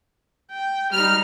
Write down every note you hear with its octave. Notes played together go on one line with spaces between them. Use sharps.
G5
G3 D#4 F6